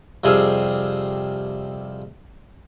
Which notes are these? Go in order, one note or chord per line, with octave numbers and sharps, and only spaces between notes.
F2 C3 G3 G#4 A4 F5